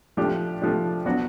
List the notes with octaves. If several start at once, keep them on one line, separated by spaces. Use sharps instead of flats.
F3 A3 D4 G4
F3 A3 D4 G4
F#3 B3 D4 F#4